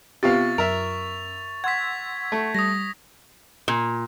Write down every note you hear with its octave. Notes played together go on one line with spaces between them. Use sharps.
C3 B3 F4 G4 F5 C#6 A6
F#2 A#4 E5 F7
F#5 C6 E6 G#6 B6
A3
G3 D#6 A#6
A#2